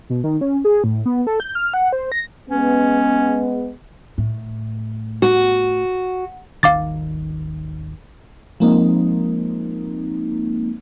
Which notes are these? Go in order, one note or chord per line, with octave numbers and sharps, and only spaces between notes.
B2
D#3
C#4
G#4
A2
B3
A4
G6
F6
F#5
C5
A#6
G#3 B3 C#4
A2
F#4
D#1 G#1 D#3 F5 D6 A6
F3 G#3 A#3 C4 D#4